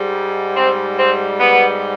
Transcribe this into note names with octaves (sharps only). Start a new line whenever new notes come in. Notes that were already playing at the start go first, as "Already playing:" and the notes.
Already playing: G#2 G3
C4
C4
B3